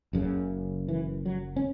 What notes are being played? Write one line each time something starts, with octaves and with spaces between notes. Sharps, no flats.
F#1 F#2 C#3
E3
F#3
C#4